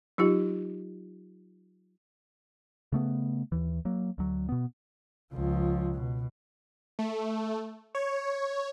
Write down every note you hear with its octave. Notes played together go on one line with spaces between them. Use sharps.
F#3 D#4 F4 G4
C#3 A3 B3
D#2 E3
F#3 A#3
D2 F#3
B2 B3
C#2 F3
B2
A3
C#5